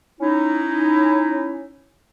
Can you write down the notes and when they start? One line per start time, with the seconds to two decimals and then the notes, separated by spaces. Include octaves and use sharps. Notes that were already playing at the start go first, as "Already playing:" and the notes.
0.21 C#4 D#4 E4